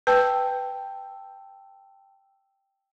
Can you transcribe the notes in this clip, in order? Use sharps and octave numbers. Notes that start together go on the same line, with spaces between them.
B4 G5 A5 E6